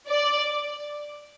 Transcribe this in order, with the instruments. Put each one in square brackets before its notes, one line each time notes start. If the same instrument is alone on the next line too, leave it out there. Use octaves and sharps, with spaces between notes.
[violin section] D5